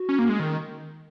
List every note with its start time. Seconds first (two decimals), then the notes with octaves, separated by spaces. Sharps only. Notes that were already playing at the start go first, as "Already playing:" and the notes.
Already playing: F#4
0.09 C#4
0.19 A#3
0.29 G#3
0.40 D#3 A#4